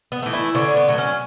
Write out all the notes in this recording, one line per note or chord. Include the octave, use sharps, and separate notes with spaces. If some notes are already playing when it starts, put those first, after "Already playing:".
B3
E3 A3
E4
D3 C#4
B3
F#3 A3
C#4